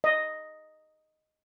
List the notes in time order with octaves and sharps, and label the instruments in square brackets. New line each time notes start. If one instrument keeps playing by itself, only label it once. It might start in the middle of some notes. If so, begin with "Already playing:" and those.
[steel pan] D#5